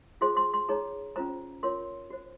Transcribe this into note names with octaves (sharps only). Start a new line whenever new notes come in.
F4 G#4 C5 C6
C6
C6
D#4 G#4 C#5 A#5
C#4 F4 C5 A#5
F4 A#4 C#5 C6
F#4 C5